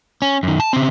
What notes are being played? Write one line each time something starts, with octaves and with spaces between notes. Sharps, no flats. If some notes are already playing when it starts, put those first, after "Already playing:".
C#4
F#2 D#3
A5
C#3 C4